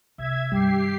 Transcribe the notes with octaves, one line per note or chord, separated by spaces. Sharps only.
C3 E5 G#6
G2 D#3 G3 G4 C7